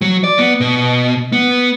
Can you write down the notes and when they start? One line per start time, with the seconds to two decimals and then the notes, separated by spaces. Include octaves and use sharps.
0.01 F#3
0.24 D5
0.39 B3
0.61 B2
1.32 B3